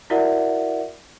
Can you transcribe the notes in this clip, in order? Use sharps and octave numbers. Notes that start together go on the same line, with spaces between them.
E4 F#4 A#4 D5 E5 F#5